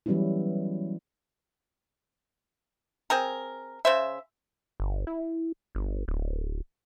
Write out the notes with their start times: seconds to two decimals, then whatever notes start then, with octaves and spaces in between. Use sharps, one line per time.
0.06 E3 F#3 G3 B3 C#4 E4
3.10 C4 G#4 A#4
3.85 C#3 C5 E5
4.80 G1
5.07 E4
5.75 G1
6.08 D1